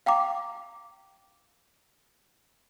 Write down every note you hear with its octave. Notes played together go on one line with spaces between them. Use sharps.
F5 G5 A#5 D6